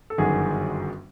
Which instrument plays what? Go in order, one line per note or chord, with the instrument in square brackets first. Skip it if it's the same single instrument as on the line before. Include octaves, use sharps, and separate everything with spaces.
[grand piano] A4
[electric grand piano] G1 F#2 D#3 [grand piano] F#4 G#4